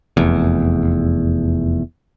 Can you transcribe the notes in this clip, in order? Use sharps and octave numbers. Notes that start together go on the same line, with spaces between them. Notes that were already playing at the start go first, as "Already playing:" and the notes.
F1 E2